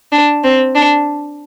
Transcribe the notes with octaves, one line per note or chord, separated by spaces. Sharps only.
D4
C4
D4